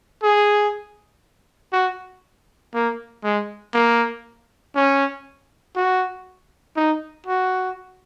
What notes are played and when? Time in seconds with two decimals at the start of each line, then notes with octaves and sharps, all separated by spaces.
0.23 G#4
1.73 F#4
2.74 A#3
3.24 G#3
3.74 A#3
4.75 C#4
5.76 F#4
6.76 D#4
7.26 F#4